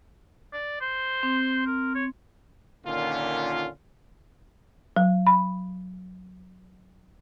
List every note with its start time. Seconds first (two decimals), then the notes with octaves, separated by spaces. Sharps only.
0.53 D5
0.81 C5
1.23 C4
1.66 A#4
1.95 C#5
2.85 A#2 D3 D#3 C#4 F4
4.97 F#3
5.27 B5